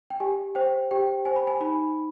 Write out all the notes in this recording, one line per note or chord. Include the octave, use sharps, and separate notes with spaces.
G5
G4 G#5
C5 G5
G4 G5
C5 G#5
B5
G#5
D#4 B5